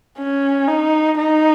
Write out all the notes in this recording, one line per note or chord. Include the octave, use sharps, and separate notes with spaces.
C#4
D#4
D#4